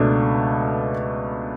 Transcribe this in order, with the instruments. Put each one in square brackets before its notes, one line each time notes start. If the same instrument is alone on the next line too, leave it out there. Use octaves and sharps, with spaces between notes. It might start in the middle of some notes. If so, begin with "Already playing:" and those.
Already playing: [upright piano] C#2 B2 A3 D4